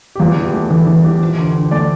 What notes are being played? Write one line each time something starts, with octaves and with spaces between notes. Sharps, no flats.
G4
E2 F4
E3
G4
A3
E3 A4
E3
E3 G4
F3
D2
D3
A3 D5